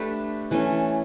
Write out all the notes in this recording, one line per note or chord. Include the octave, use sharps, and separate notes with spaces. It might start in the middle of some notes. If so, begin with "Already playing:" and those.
Already playing: A3 D4 G4 B4
E3 A3 C#4